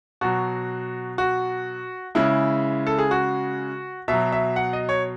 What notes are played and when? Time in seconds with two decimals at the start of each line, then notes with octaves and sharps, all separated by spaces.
0.21 B2 F#3 F#4
1.18 F#4
2.15 C#3 G#3 E4
2.87 A4
2.99 G#4
3.11 F#4
4.08 B2 F#3 E5
4.32 E5
4.56 F#5
4.73 D#5
4.89 C#5